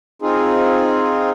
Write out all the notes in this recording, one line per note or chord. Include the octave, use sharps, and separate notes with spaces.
C4 D#4 F4 G#4